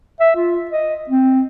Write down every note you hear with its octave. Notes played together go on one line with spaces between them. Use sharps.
E5
F4
D#5
C4